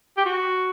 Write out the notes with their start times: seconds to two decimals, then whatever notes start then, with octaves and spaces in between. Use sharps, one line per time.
0.17 G4
0.26 F#4